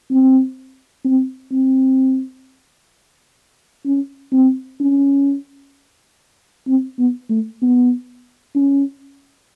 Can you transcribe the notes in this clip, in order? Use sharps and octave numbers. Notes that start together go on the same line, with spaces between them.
C4
C4
C4
C#4
C4
C#4
C4
B3
A3
B3
C#4